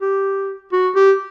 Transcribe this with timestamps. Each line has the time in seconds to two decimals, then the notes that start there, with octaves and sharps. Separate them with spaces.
0.02 G4
0.72 F#4
0.96 G4